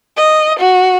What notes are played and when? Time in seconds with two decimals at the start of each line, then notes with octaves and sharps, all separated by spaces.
0.17 D#5
0.59 F#4